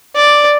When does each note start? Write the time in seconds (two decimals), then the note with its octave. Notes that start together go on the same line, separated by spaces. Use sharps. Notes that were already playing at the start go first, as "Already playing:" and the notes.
0.16 D5